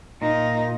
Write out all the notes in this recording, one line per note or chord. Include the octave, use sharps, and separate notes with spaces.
A#2 D#4